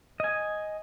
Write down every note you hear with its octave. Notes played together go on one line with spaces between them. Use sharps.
D#5 G#5